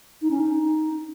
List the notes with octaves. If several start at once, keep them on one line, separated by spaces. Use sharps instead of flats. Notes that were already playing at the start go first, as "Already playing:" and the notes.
D#4
C#4
D#4